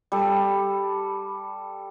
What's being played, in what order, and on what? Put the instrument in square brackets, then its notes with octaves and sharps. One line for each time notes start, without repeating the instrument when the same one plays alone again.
[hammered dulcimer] G3 A4